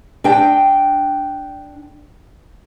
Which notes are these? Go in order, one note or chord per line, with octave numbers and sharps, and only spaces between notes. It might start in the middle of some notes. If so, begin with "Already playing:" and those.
D4 G5